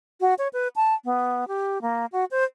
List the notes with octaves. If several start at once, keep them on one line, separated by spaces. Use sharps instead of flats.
F#4
C#5
B4
A5
B3
G4
A#3
F#4
C5